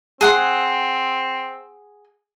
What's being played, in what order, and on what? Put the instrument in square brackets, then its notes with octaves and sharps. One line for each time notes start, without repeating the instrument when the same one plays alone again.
[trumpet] C4 [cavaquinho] G#4 F#5 C6